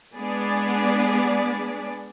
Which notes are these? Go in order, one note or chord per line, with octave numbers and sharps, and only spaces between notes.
G#3 B3 D4 G#4 D5